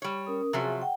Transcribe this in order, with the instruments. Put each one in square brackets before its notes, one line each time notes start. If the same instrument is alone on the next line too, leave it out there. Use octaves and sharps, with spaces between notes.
[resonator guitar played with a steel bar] G3 C#5
[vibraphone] C#4 A#4 D#6
[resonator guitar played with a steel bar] C3 F3 F#3 [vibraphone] G#4 E5 G#5
[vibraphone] F#5 G5